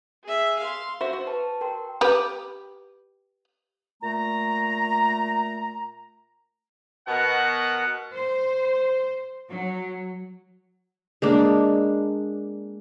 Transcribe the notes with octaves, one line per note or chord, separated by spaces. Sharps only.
G#4 E5
F5 C6
F#4 C5 E5
F#4
B4 A5
A#4 G5 C6
G4 B4
A#2 A3 A#5
B2 A#4 F#5
C5
F#3
G#3 A#3 D4